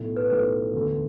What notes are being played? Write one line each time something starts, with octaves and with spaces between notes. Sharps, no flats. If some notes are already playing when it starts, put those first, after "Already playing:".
Already playing: B1 A2 A3
B4
B1 A2 A3 B4
E1 D2 D3